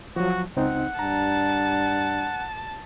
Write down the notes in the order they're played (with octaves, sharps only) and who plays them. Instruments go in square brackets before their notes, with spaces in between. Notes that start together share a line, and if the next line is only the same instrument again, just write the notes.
[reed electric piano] F3 F#3 [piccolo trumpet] F#4
[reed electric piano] C#2 C4 D#4 [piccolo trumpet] F#5
[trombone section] G2 D4 [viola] A5 [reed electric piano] A#5